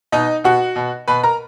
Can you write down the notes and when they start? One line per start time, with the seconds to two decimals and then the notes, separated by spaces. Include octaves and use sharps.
0.12 B2 D#4 D#5
0.44 B2 F#4 F#5
0.76 B2
1.08 B2 B4 B5
1.24 A#4 A#5